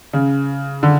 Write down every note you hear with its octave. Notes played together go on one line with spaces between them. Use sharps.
C#3
D3